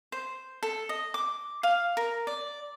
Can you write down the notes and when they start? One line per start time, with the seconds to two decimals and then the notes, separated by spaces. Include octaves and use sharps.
0.12 C5
0.63 A4
0.89 D#5
1.14 D6
1.63 F5
1.97 A#4
2.27 D5